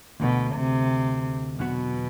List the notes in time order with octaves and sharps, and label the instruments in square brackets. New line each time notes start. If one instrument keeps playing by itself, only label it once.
[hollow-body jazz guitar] D2 D3 A3 [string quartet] B2
[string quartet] C3
[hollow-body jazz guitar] E2 D3 F#3 B3 F#4 [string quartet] B2